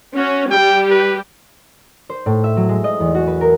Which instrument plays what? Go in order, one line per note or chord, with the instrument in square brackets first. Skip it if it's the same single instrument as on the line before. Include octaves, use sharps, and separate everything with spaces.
[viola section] C#4 [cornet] F#4
[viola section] G3 G4 [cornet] G5
[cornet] B4
[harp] C5
A2
E5
F#3
G#3
D#5
E2
F#4
B4
A#4